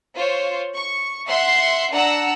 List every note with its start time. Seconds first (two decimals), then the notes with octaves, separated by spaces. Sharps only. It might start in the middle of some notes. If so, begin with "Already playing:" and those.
0.15 F4 C5 C#5
0.74 C#6
1.26 E5 F#5 C6 C7
1.91 D4 F#5 A#5 E6